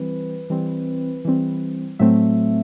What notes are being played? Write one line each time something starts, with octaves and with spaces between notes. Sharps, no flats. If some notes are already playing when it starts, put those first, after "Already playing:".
Already playing: E3 G3 C4 B4
E3 G3 C4
E3 G3 C4
A2 F#3 A3 C4 E5